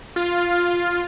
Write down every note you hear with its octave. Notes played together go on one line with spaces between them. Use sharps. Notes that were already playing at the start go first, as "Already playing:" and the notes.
F4